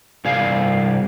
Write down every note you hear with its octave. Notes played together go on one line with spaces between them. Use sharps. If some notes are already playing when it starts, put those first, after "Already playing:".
C2 G2 G#4 F5